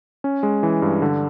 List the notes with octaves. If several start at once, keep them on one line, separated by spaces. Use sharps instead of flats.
C#4
G#3
E3
G2
D3